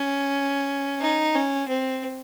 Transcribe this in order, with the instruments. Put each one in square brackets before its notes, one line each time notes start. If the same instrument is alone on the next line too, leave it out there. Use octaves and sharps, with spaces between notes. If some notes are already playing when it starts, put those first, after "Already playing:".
Already playing: [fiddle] C#4
D#4
C#4
C4